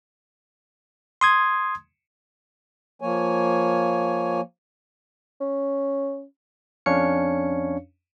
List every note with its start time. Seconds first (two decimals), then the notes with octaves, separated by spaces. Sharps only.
1.21 C6 D#6 G#6
3.01 F3 A#3 C#5 G#5
5.40 C#4
6.86 F2 C#4 D4 C#5 F5 C#7